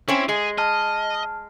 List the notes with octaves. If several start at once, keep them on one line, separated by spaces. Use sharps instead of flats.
C4 C#4 E4
G#3 G#4
D#5 A5 F6